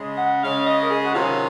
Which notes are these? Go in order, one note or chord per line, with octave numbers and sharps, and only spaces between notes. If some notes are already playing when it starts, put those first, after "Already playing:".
Already playing: C#3 G#3 C#4
F#5
C#3 G#3 C#4 F5
D#5
A#4
G#4
F#4
C3 D#3 F#3 C#4 F4